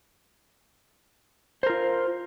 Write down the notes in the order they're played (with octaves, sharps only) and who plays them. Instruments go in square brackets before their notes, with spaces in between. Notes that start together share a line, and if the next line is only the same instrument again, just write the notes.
[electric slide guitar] C5
A#4
F4